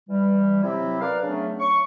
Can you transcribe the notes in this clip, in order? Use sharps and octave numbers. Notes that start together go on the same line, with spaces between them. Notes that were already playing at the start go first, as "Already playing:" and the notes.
E3 G3
C3 F#3 C4 E4 G4
A#4 B4 D5 F5
C#3 F#3 A3 B3 C#4 D4
C#6